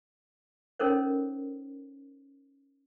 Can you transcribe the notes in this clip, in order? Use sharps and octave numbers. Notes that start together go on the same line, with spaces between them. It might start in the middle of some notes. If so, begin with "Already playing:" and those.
C#4 D#4 A4 A#4 C5 C#5